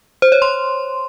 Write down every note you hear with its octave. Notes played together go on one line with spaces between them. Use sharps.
C5
C#5
C6